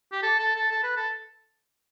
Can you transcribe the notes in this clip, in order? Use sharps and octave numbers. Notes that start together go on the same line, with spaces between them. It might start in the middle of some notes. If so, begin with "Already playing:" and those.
G4
A4
A4
A4
A4
B4
A4